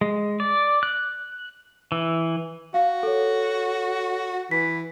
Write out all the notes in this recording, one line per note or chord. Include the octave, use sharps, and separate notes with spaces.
G#3
D5
F#6
E3
F#4 F5
A4 C#5
E3 B6